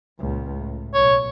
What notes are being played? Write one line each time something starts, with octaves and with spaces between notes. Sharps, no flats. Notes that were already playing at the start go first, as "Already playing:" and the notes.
C#2 A#2
A2
B1 C#5